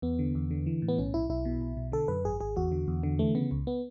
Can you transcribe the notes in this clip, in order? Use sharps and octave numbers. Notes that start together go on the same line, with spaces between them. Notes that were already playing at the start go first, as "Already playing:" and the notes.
E2 B3
D3
E2
D3
E3
A2
B3
B1 C#4
B1 E4
B1 E4
B2
B1
B2
D3 A4
F#2 B4
G#1 G#4
G#1 G#4
E2 F#4
D3
E2
D3
E3 A3
C#3 B3
C#2
B3